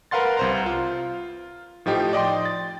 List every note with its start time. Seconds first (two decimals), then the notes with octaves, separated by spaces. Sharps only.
0.11 A#4 B4 F5 F#5 C6 A6
0.37 C2 C5 A#5
0.66 F4
1.86 A2 F3 D#4 G4
2.13 D5 D#5 G5 C6
2.46 A6